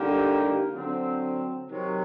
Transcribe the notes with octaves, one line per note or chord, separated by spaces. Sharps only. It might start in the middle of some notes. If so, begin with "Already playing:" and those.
Already playing: D3 G3 A#3 D#4 G4
D3 F#3 C4
C3 D#3 F#3